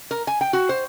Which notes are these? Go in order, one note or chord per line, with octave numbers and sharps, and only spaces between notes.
A#4
G#5
G5
F#4
C5